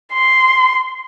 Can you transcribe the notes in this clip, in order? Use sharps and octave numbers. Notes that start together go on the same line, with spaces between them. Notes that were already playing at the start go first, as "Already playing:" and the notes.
C6